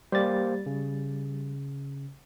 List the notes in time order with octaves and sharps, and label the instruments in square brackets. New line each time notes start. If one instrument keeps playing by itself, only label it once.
[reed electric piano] G3 A6 [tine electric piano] A#3 G4 C5
[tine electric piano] C#3